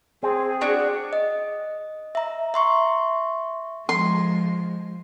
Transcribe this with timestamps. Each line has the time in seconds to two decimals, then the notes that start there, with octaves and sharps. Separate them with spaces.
0.23 C4 G#4
0.61 D4 F#4 D5
1.13 D#5
2.15 E5 A#5
2.54 E5 C6 C#6
3.89 F3 G#3 C6